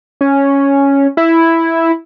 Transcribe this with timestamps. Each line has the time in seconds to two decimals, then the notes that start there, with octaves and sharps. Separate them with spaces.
0.21 C#4
1.17 E4